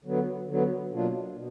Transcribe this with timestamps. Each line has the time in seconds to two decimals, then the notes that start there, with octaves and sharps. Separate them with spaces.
0.04 D3 F#3 B3
0.48 D3 F#3 B3
0.91 B2 F#3 A#3 D4 F4
1.35 B2